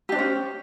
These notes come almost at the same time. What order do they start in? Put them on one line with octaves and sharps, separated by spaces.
G4 D4 C5 C#4